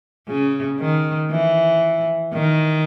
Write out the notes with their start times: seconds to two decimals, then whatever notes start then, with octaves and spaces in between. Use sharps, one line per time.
0.28 C#3
0.79 D#3
1.31 E3
2.33 D#3